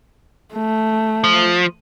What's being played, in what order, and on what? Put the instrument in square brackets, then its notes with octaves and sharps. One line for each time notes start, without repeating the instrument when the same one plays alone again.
[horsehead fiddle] A3
[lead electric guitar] F3